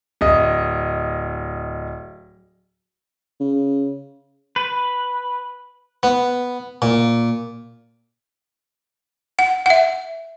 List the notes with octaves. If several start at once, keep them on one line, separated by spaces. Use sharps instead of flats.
D1 D#5
C#3
B4
B3
A#2
F#5
E5 F#5